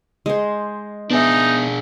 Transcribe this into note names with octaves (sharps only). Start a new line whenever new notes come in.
G#3 C5
B3 D4 D#4 G#4 E5